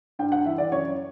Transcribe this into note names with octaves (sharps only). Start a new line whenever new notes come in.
G2 G5
F#5
E3 E5
D5
F#2 C#5